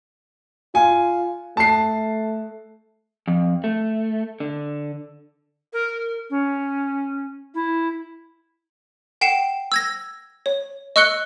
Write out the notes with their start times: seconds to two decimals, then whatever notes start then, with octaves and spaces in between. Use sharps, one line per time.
0.75 F4 G#5
1.57 A3 A5 C7
3.28 F2
3.64 A3
4.40 D3
5.73 A#4
6.30 C#4
7.54 E4
9.21 F#5 G5 C7 E7
9.72 E6 G#6 A#6
10.46 C#5
10.96 D#5 C#6 E6 F#6 C#7 G7